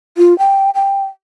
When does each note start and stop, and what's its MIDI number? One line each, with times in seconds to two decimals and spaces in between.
0.17 0.37 65
0.39 0.70 79
0.75 1.04 79